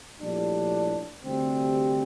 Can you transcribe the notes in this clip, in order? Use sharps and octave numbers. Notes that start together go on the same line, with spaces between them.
A#1 A2 G3 D4
D2 C3 G3 C4